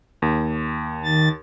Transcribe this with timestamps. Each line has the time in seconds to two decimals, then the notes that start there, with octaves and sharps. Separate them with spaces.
0.22 D#2
1.04 D#3 A6